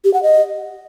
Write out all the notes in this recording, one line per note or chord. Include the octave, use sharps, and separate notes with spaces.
G4
F#5
D#5